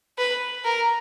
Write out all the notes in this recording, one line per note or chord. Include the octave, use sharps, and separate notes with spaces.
B4
A#4